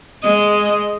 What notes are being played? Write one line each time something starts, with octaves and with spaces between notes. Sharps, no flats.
G#3 D#5